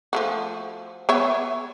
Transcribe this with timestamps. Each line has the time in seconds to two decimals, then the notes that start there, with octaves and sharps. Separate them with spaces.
0.13 F3 A3 F#4
1.09 B3 C#5 E5